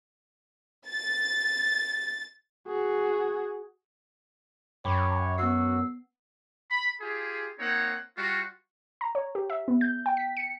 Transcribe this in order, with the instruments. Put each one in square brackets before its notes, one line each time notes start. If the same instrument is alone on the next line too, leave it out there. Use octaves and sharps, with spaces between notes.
[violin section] A6
[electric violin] F#4 G#4
[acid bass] F#2 [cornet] C#5 [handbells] G5 B5 D6
[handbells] B3 C7 [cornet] F#4 [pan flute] E6
[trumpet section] B5
F4 G4 G#4
A#3 C4 D#4 C#5 F#5
G3 F4 F#4
[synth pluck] A#5
C#5
G4
E5
B3
G6
G5
B6
C#7